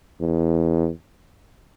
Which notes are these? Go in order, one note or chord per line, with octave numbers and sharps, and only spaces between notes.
E2